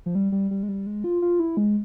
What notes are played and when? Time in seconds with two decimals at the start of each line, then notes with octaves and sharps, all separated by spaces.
0.06 F3
0.15 G3
0.32 G3
0.51 G3
0.63 G#3
0.69 G3
0.87 G#3
1.04 F4
1.22 F4
1.40 E4
1.57 G#3